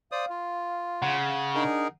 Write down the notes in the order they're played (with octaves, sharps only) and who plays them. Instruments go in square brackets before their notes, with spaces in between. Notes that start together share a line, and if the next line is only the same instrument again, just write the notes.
[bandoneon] C5 D5 D#6 [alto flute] F5
[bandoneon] F4
[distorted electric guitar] C#3 [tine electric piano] F#5
[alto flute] D4 [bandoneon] D#4 G#4 A#4